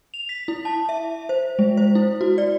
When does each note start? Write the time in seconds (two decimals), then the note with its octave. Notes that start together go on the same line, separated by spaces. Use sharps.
0.14 F7
0.29 B6
0.48 E4
0.65 A5
0.89 E5
1.29 C5
1.59 G#3
1.77 C5
1.95 E4
2.21 F#4
2.38 D5